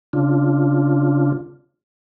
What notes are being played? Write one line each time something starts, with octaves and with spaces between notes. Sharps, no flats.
C#3 D4 F4